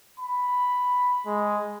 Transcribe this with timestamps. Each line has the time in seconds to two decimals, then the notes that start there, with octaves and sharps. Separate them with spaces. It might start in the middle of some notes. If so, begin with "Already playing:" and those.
0.20 B5
1.26 G#3